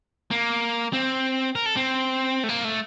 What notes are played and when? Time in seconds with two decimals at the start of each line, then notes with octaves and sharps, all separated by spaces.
0.31 A#3
0.93 C4
1.55 A#4
1.66 A4
1.77 C4
2.44 A3
2.49 A#3
2.65 A3